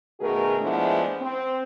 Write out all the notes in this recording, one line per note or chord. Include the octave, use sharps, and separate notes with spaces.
B2 D#3 A3 F#4 G#4 A#4
F3 G#3 A3 B3 D4 E4
C4